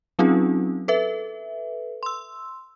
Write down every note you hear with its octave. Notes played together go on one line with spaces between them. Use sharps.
F#3 C4 C#4 D#4 F4 G#4
A4 B4 E5
C6 E6